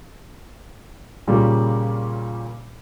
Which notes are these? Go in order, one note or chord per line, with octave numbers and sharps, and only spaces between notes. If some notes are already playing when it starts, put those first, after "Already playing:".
A#2 C#3 G3 A#3 C#4